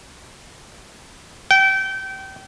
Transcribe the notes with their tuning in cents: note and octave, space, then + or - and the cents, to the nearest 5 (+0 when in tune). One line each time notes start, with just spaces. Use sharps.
G5 -25